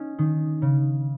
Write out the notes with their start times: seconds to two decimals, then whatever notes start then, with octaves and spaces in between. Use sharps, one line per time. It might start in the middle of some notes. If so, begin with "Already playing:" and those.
Already playing: C#4 D#4
0.19 D#3
0.62 C#3